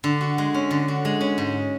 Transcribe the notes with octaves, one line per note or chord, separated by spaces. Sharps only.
D3
F#4
G#3
C#4
D3
F#4
G#3
C#4
G#2